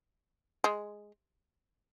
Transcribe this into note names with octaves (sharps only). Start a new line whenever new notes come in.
G#3